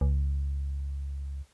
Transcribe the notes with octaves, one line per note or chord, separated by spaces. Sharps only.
C#2